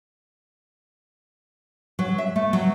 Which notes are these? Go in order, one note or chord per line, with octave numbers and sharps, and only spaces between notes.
F#3
E5
A3
F#3